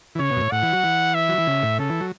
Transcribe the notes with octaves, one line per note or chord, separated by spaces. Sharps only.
E3
C#3 C#5
B2
F#2
A2
A2 F#5
E3
F#3
E3
E5
F#3
E3
C#3
A2
C#3 A4
E3
F#3